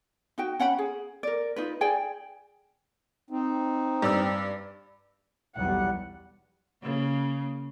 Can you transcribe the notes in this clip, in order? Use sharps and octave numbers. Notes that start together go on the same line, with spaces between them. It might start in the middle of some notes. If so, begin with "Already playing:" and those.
D#4 F#4 G5
C#4 F#5 G5 B5
G#4
A#4 D5
D#4 F4 B4
G#4 D5 G5 G#5
C4 D#4
G2 D5 E6
B1 E2 G3 F#5
C#3 A#3